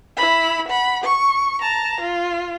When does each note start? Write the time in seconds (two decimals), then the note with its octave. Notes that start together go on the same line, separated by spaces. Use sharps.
0.17 E4 B5
0.68 F#5 B5
1.04 C#6
1.61 A5 A#5
2.01 F4